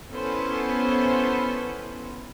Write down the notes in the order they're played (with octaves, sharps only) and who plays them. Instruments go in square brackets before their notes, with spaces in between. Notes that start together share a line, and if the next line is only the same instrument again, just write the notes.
[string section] B3 C#4 E4 A4 B4 C5